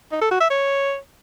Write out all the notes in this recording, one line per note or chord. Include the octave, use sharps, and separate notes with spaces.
D#4
A4
F#4
E5
C#5